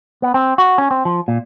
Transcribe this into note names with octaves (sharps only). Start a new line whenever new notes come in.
B3
C4
F#4
C#4
C4
F3
A#2